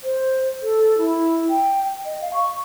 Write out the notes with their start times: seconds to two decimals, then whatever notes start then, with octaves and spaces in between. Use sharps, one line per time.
0.03 C5
0.62 A4
0.98 E4
1.50 G5
2.05 D#5
2.21 F5
2.33 C#6